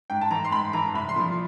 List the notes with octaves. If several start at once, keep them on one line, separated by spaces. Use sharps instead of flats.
G#2 G5
A5
E3 A#5
C6
G#2 B5
E3 A#5
C2 B5
C6
A#2 F3